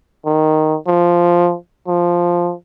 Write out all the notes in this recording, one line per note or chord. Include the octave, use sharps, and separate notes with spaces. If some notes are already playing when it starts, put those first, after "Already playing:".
D#3
F3
F3